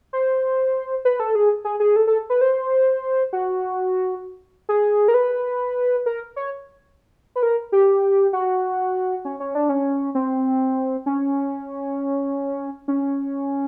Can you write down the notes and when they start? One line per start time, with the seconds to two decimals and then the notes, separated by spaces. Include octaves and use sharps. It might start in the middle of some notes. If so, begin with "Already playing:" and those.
0.13 C5
1.05 B4
1.20 A4
1.35 G#4
1.65 G#4
1.80 G#4
1.96 A4
2.07 A4
2.30 B4
2.41 C5
3.33 F#4
4.69 G#4
5.08 A#4
5.14 B4
6.06 A#4
6.36 C#5
7.36 B4
7.43 A#4
7.72 G4
8.33 F#4
9.25 C#4
9.40 C#4
9.55 D4
9.69 C#4
10.15 C4
11.06 C#4
12.88 C#4